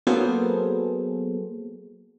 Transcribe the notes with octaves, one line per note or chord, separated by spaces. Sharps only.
F#3 A#3 B3 G#4 A4 C5